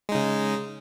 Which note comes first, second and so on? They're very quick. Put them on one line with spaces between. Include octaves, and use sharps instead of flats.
G#3 D#4 C#3